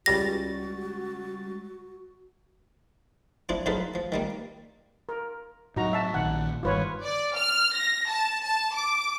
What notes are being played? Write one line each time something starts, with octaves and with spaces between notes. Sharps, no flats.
C#2 G3 F#4 A6 A#6
F3 D4 E4 F4
F#2 C#3 F3 D#4 A4 B4
F3
D#3 G3 A#3
A#4
A2 F#3 D#4 F#4 A#5
E5 A5
A#1 A#2 D#3 F#5
F#1 G2 D#3 F4 B4 C#5
D5
F6
A#6
A5
A5
D6